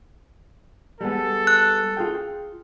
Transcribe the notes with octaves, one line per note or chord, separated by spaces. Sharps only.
G3 G#3 B3 A4
F#6
F4 G#4 G5